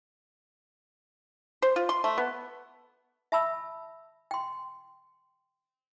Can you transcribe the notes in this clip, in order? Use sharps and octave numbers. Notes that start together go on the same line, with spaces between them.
C5
F4
C6
A3
B3
E5 A5 B5 E6
G5 C6